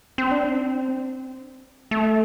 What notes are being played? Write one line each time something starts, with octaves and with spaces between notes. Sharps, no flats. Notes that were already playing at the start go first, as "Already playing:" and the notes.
C4
D4
C4
A3